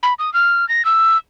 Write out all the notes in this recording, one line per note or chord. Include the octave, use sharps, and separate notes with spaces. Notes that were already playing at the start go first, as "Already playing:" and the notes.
B5
D#6
F6
A#6
E6